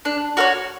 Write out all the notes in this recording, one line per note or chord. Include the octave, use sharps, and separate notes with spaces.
D4
F#4 A#4 C#5